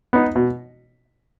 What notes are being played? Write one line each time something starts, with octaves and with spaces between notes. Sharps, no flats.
B3 D#4
B2